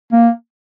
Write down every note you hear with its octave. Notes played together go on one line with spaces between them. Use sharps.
A#3